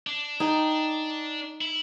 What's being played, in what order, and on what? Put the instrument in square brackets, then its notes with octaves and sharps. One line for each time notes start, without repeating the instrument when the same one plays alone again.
[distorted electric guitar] D4
[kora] D#4 G5
[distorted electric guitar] E4